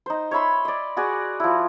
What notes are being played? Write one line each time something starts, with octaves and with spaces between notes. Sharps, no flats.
D#4 C5
C#5 E5 B5 C6
D5 D#5
F#4 G#4 D5
F3 E4